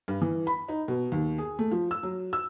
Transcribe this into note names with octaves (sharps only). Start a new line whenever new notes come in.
G2
E3
B5
D#4
B2
D#2
G#4
A3
F3
E6
F#3
E6